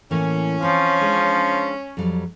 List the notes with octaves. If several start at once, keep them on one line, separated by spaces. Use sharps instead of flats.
A2 E3 A#3 C#4
F3 C4 C#5
G#3 D4
F2 F#3 G3